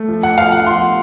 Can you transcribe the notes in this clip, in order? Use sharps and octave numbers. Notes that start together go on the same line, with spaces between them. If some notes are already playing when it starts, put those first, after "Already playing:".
Already playing: A3
F3
F#5
F3 F5
F#5
F3 C6